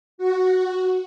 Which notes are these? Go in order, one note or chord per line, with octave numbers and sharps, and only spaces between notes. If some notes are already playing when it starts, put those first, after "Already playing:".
F#4